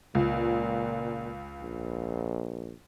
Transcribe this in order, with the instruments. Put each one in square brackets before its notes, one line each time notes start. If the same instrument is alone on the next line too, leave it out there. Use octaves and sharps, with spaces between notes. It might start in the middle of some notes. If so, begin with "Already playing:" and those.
[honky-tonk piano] C#2 [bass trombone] A#2
[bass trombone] A#1